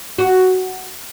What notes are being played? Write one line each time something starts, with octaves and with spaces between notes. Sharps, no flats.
F#4